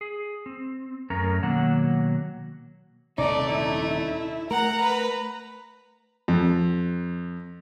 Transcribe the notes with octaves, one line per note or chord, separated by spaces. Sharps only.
G#4
C4
F#2 A3 C#4 A#4 A#5
B2 D#3 F#3 A#3 F#5
D#1 C3 A3 C#4 D#4 D5
E4
A3 A#4 F#5 A#5
B4
F2